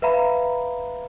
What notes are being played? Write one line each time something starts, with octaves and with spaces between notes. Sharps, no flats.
B4 E5 F5 A#5 B5